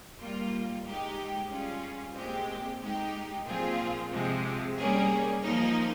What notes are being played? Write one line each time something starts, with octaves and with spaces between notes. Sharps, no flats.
G3 A#3 F4
G#3 D#4 G4
G3 C#4 F4 G#4
A#2 G#3 C4 G4
G#3 D#4 G4
A#2 F3 C4 F4 G#4
C3 F3 G#3 C4
G3 A#3 C#4 G#4
F3 A#3 D#4